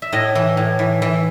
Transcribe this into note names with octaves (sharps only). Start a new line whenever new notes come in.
E5
A2 D#5
E3
A2
E3
E3